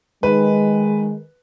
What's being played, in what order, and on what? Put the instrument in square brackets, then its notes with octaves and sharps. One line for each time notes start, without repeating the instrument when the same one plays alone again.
[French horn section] D#3 G#3 [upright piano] B4